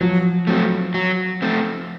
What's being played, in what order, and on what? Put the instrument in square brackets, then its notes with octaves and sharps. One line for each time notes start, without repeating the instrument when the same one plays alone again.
[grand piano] F3 [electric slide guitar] F#3
[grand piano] F#3 [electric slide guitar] A3 C4
[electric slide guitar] F#3
A3 C4